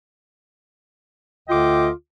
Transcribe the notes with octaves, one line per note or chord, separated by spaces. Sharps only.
D2 D3 F4 D#5 G5 D6